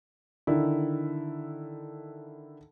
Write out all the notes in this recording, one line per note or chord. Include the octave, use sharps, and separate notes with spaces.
D3 D#3 E4